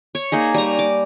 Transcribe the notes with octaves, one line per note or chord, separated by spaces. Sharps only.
C#5
A#3 D#4 G#4
G3 G#5 A#5
D6